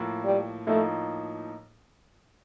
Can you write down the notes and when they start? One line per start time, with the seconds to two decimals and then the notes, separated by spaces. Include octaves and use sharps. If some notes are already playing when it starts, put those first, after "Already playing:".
Already playing: A2 F3 A#3
0.24 G3
0.67 A2 F3 A3 A#3 D#4